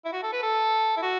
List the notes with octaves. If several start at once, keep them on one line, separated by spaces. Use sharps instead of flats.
E4
F#4
A4
B4
A4
E4
F#4